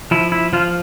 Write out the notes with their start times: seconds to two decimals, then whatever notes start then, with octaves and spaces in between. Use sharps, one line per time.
0.11 F3 E4
0.32 E4
0.53 F3 F4